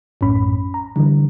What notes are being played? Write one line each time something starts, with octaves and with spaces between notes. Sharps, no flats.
A#1 F#2 A2 C#4 B5
A#5
D3 E3 G3